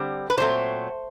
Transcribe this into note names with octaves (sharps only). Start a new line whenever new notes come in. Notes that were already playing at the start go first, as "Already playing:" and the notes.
Already playing: D3 G3 C4
B4
A#2 F#3 A3 C4 C5